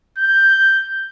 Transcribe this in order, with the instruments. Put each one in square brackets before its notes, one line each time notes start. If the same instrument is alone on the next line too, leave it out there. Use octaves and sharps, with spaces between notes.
[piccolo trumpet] G6